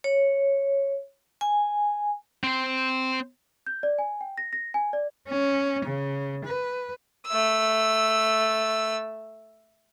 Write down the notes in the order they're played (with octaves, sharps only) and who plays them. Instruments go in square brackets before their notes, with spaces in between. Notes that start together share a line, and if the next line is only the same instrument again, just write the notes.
[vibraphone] C#5
G#5
[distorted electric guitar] C4 C5
[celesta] G6
D5
G#5
G5
A#6
A#6
G#5
D5
[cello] C#4
C#3
B4
[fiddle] A3 E6